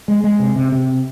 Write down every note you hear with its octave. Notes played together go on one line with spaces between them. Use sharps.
G#3
G#3
C3
C3
C3